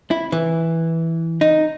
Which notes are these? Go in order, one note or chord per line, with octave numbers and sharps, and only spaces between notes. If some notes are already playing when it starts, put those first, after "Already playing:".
E4
E3
D#4